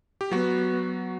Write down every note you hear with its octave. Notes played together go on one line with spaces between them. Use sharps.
G4
F#3 B3 F#4